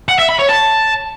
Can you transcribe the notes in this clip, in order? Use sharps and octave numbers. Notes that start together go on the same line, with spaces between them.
F#5
E5
B5
C#5
A5